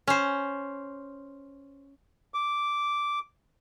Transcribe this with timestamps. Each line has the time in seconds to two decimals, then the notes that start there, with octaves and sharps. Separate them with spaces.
0.07 C#4 C5
2.34 D6